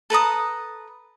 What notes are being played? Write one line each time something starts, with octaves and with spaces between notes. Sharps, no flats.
A4 B4 A#5 D#6